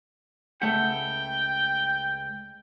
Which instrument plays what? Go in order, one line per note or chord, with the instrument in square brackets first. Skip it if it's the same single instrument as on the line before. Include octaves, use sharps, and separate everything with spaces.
[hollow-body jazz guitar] C#2 A3 F#5 [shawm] G5